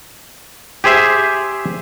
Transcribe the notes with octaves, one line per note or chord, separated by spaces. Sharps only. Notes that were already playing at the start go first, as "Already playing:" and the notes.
G4 G#4 C5 E5